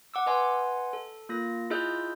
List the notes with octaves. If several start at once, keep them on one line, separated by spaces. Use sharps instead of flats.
F#5 D6 E6
B4 D#5 F#5 G#5 C6
A4
A#3 F4 A#6
E4 F4 G#4 D#5 E6 G6